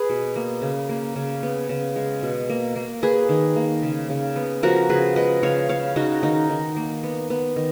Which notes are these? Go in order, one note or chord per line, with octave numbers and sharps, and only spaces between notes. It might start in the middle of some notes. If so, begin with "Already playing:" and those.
Already playing: G#4 B4
B2
A#3
C#3
A#3
C#3
B3
C#3
G#3
B2
A#3
A#3
A#3 G#4 B4
D#3
A#3
C#3
C#3
B3
F3 F#4 A#4
C#3 G#4 B4
G#3 B4 D#5
C#3 C#5 F5
C#3 C#5 F5
C#3 D#4 F#4
D#3 D#4
D#3
A#3
B3
B3
D#3